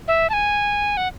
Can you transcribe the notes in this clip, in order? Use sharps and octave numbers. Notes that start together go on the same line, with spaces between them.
E5
A5
G#5
F#5